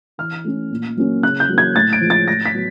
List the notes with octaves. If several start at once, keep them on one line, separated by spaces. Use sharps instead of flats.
E3 F6
A3 C#4
A#2
F#3 A#3 C#4
C#3 F#6
G6
F#3 A#3
G#6
A2 A6
D7
F3 G#3
A6
A2 A#6
B6
F#3 B3